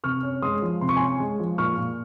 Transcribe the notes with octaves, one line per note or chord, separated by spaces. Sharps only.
C3 C#6 F6
C#4
G#3 C6 D#6
F3
C3 C6
C#6
G#5 C6
C#4
G#3
F3
A#2 C#6 F6
A#2